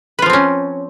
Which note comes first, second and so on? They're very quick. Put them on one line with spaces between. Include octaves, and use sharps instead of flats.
B4 F4 F3 C4 C#4